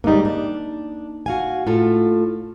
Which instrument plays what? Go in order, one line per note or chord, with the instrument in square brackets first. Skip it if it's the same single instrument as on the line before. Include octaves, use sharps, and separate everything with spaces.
[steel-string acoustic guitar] G#2 D#3 G3 [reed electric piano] A#3 D#4
[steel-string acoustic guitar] D4
F#4 F5 G#5
A2 F4 A4